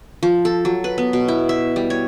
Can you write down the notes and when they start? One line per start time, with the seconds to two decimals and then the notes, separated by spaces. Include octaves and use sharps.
0.23 F3
0.45 A4
0.65 F#3
0.84 B4
0.98 B3
1.13 B2
1.28 E4
1.49 E5
1.76 G3
1.90 C#5